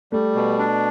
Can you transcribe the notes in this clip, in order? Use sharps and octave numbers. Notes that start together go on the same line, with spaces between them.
G3 A3
B2
D4